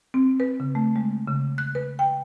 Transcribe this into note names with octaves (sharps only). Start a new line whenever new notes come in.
C4
B4
C#3
A3
G#3
C#3
F#6
B4
G5